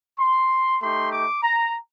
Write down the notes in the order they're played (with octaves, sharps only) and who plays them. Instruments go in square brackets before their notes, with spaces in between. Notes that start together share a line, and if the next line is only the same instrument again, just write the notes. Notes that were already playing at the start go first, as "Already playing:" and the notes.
[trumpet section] C6
A3 D#4 G4 C6
D6
A#5